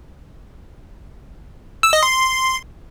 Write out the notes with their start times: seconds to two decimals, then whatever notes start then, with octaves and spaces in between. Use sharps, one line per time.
1.83 E6
1.93 D#5
2.03 C6